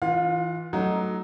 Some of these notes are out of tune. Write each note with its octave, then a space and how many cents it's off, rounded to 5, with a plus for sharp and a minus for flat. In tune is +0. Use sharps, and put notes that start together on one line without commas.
E3 -20 F4 +0 F5 +30
F#3 +10 A3 +0 D#4 +0